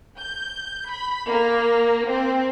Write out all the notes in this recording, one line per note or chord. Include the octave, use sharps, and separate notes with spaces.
G6
B5
A#3
C4